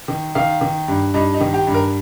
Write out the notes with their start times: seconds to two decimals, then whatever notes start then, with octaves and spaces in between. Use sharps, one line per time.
0.08 D#3
0.35 D#3 F5
0.61 D#3
0.88 G2
1.14 G2 D#4
1.34 D#4
1.41 D#3
1.54 G4
1.67 G2
1.74 A#4